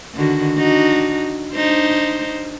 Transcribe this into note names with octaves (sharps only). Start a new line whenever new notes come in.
D3 D#3 F#4
D4 D#4 F#4
D4 D#4 C5